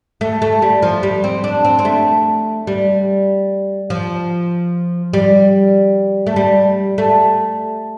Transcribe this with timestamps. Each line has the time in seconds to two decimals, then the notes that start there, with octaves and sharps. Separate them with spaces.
0.21 A3
0.42 A3
0.62 G3
0.83 F3
1.03 G3
1.24 C4
1.44 D4
1.64 C4
1.79 C4
1.85 A3
2.67 G3
3.90 F3
5.13 G3
6.26 A3
6.36 G3
6.98 A3